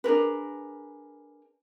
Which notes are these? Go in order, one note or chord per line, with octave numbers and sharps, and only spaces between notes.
D4 G#4 A#4 B4